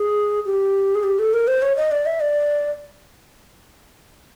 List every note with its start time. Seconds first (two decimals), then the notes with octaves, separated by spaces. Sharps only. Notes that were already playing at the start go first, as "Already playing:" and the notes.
Already playing: G#4
0.45 G4
0.95 G#4
1.03 G4
1.19 A4
1.33 A#4
1.48 C5
1.62 C#5
1.77 D#5
1.91 D5
2.06 E5
2.21 D5